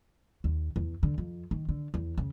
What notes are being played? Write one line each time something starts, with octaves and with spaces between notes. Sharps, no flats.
D#2
E2
D3
F2
D#3
D3
E2
C#3